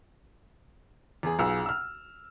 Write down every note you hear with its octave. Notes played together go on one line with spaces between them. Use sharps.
E2 G#4
B1 F4 G#4 E6
E6 F6